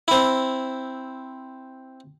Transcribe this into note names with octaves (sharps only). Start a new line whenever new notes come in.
C4 E4